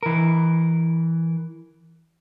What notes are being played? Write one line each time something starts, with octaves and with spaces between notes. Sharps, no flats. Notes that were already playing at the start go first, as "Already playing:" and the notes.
E3 A#4